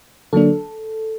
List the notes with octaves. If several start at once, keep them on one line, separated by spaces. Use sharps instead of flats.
D3 F#3 A#3 D4 A4